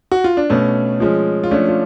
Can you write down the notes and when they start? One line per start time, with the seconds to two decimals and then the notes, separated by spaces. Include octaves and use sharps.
0.12 F#4
0.24 F4
0.37 D4
0.50 B2 A3 C#4
1.00 F3 G#3 C#4
1.44 F4
1.51 F3 A3 C#4 D4
1.68 F4